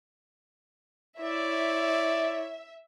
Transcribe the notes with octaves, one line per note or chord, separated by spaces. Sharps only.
E4 C#5 D5 E5